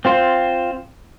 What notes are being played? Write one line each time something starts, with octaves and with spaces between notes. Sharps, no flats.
C4 F4 C5